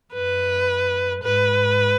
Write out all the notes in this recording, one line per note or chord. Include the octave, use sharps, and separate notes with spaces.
F#2 B4
G#2 B4